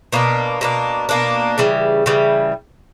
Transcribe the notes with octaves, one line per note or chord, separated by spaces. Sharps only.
B2 A#3 D4
B2 A#3 D4
B2 A#3 D4
C#3 E3 G3
C#3 E3 G3